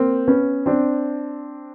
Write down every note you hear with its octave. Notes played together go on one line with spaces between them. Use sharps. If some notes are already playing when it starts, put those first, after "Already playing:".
Already playing: A#3 C4
B3 C#4
C4 D4